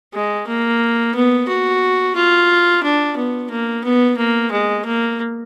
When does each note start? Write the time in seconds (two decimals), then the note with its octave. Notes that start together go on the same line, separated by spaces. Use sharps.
0.14 G#3
0.47 A#3
1.15 B3
1.48 F#4
2.16 F4
2.83 D4
3.17 B3
3.50 A#3
3.84 B3
4.17 A#3
4.51 G#3
4.85 A#3